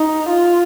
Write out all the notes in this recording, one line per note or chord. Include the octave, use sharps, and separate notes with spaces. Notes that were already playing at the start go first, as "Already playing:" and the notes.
Already playing: D#4
F4